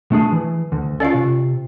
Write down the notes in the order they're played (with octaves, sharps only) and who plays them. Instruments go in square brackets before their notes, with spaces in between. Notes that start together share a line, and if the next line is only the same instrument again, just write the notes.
[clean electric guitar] A3 D4 G#4
E3
D2
[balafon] C#4 F4 [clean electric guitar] A4 D5 F5
[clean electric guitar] C3